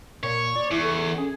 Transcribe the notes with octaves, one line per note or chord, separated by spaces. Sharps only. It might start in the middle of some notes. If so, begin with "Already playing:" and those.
A#2 C#5
D5
E2 E4 C#6
A4
C#4 G#4